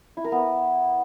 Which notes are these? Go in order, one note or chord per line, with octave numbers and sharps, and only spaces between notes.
E4
A#4
B3